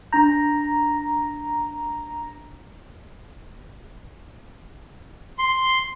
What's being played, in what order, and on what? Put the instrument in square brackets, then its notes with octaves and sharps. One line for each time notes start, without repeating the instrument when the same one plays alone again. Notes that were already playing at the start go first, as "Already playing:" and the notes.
[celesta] D4 G6 [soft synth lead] A#5
[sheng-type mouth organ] C6